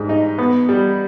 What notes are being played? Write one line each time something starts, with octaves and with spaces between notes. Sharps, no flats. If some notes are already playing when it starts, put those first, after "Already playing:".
Already playing: G#2 G3
D#4
B3
G3